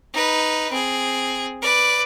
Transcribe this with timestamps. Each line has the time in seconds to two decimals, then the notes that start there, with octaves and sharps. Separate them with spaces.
0.14 D#4 B4
0.71 C4 G#4
1.62 B4 D5